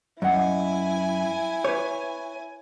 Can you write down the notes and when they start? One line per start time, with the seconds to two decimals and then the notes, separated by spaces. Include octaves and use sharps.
0.22 F#2 E4 D#5 F#5 G#5
1.65 B4 C#5